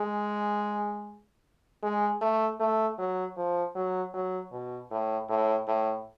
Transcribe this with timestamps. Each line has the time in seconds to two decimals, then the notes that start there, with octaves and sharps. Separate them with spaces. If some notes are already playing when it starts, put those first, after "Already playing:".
Already playing: G#3
1.83 G#3
2.21 A3
2.60 A3
2.98 F#3
3.37 F3
3.75 F#3
4.14 F#3
4.52 B2
4.91 A2
5.29 A2
5.67 A2